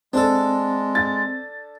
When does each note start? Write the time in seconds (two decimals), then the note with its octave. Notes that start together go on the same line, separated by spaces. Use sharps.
0.13 G#3 C4 D4 A4
0.95 A6